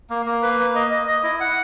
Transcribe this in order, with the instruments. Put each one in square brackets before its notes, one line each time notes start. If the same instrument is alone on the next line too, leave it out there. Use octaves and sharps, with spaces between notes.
[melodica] A#3
A#3
B4
A#3
D#5
D#5
D#5
E4
F#5